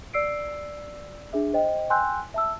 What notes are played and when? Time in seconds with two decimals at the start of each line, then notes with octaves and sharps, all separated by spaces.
0.13 D5 E6 C7 D7
1.33 D4 G#4 E5
1.53 C5 D#5 G5
1.90 G5 G#5 C6 E6 F#6 G6
2.34 E5 A5 E6